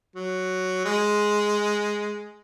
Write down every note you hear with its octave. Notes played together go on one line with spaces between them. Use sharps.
F#3
G#3